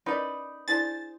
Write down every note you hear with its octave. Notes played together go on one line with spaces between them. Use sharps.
C#4 D#4 A#4 B4 D5 D#5
D4 E4 G#4 C5 D5 A6